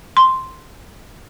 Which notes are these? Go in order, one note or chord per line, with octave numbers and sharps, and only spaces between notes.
C6